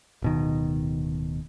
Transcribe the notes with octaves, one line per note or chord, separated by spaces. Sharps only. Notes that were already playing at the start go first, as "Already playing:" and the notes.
D1 B2 D#3